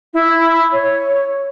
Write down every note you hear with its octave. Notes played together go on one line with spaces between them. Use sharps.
E4
C#5